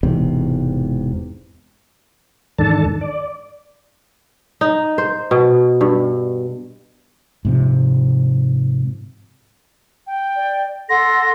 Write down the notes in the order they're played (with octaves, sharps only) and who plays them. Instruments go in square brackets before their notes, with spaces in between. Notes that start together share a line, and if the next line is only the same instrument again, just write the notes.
[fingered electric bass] E1 E2 G#2 C3
[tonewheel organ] E2 G#2 D#3 D4 A4 A5
D5
[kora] D#4
C5
B2
G2
[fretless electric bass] G#2 C3 F3
[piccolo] G5
[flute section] D5
[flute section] A4 F#5 C6 [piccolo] A#6